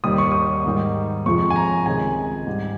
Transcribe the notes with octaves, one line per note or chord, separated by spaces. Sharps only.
D#2 D#3 G3 D#6
C#6
D#6
G#2 D#3 G3
F2 C3 F3 G#3 C#6
G#5
A#5
C#2 C3 D#3 G#3 G#5
G#2 G3